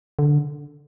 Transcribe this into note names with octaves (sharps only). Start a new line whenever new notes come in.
D3